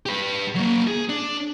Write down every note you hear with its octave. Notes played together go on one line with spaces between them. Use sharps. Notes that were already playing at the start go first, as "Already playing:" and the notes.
G4 B4
F#3 A#3
G#4
D4